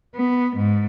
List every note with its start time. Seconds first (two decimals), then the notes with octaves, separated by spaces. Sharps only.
0.16 B3
0.56 G#2